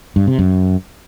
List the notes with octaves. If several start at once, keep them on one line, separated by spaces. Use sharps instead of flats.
G2
C3
F#2